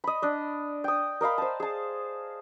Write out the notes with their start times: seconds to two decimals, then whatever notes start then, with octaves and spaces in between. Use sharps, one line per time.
0.04 D#5 B5
0.22 D4 D#5
0.84 G5 D#6
1.21 A#4 D#5 F5 B5
1.38 C5 A5
1.60 G#4 A5